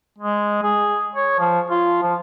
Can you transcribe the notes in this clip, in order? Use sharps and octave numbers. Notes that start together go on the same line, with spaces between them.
G#3
G#4
C#5
F3
F4
F3